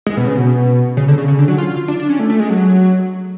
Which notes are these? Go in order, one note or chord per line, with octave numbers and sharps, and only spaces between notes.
G#3
B2
C#3
B2
C#3
D3
C#3
C#3
D3
F#3
F4
D4
D4
C#4
A3
A3
G#3
F#3